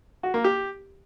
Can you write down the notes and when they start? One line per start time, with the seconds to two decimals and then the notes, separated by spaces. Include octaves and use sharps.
0.23 F#4
0.34 A#3
0.44 G4